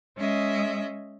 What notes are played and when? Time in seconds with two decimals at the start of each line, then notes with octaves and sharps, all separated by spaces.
0.17 G#3 C#4 D#5 E5